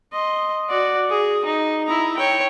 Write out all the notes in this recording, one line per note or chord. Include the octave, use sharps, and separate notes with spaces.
D#5 C6
F#4 D5
G#4
D#4
E4 A#5
C#5 G5